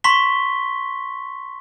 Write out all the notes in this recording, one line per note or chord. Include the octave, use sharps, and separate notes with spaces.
A#5 C6 C#6 B6 G7